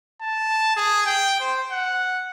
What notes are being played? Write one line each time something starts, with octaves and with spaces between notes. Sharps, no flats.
A5
G#4
G5
C5
F#5